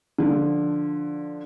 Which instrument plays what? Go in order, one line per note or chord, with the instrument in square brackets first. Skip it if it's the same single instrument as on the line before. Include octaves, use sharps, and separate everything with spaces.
[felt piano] D3 F3